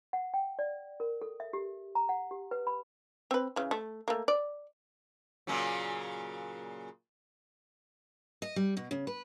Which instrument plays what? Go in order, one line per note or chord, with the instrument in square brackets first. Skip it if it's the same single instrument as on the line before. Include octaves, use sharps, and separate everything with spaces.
[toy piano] F#5
G5
D5
A#4
A4
E5
G4
A#5
F#5
G4
B4
B5
[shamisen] C4 B4
C#3 E3
A3
A3 A#3
D5
[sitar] A#2 C#3 F#3
[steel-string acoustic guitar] D#5
G3
B2
C#3
B4